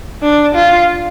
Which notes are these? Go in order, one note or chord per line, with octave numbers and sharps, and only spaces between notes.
D4
F4